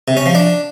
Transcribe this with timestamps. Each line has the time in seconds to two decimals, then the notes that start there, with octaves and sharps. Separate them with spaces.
0.08 C3
0.17 C#4
0.26 F3
0.35 D4